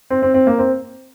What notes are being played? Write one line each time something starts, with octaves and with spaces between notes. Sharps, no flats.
C4
C4
C4
A#3
C4